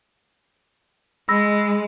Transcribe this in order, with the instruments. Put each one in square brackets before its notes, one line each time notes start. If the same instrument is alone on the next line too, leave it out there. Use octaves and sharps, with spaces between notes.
[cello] G#3 [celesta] B5 E6 A#6